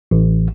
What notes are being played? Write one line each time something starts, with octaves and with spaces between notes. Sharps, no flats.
A1